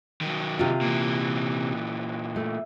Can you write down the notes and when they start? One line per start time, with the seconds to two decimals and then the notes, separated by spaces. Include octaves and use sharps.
0.21 D#3 F#3
0.59 C3 F4
0.81 A#2 E3
2.36 A3